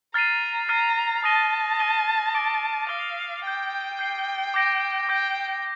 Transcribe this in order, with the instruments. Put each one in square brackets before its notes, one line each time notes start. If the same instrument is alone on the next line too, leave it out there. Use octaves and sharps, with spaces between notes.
[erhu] A#5 [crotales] F6 A6 C7 D#7
[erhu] A#5 [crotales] F6 A6 C7 D#7
[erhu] A5 [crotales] D#6 A#6 D#7 G7
[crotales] D#6 A#6 D#7 G7
D6 A6 D7 G7
[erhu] F5 [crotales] D6 A6 D7 G7
[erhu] G5 [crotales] G6 C7 G7
[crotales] G6 C7 G7
D6 G6 A#6 D7
[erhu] G5 [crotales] D6 G6 A#6 D7